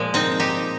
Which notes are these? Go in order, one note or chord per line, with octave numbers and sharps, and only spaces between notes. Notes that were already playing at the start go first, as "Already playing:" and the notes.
Already playing: A#2 F3 G#3 A#3
C4 D#4
D#4 G4